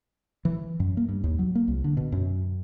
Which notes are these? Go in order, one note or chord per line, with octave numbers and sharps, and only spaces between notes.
E3
F#2
A#3
G2
D#2
F#3
A#3
C2
D3
B2
F#2